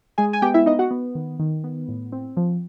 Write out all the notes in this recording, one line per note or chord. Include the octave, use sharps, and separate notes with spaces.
G#3 G#4 G#5
G#5
B3 G4 G5
E4 E5
B3 D#4 D#5
F#4 F#5
B3
D#3
D#3
B3
A2
C4
F3